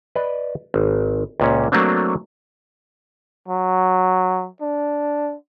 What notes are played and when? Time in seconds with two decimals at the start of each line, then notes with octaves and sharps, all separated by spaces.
0.15 B4 D5 D#5
0.74 G#1
1.40 C#2 A#2 C#4
1.72 F#3 A3 A#3 C4 D4
3.48 F#3
4.61 D4